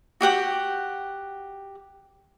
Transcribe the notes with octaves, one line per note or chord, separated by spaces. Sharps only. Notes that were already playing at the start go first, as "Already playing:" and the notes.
F#4 G4 F#5 G5